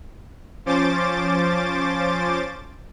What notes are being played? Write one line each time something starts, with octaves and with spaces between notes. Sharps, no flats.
F3 C#4 C5 D6 A6